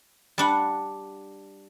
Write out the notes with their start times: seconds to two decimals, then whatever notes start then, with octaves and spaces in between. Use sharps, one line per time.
0.38 G3 D4 F#5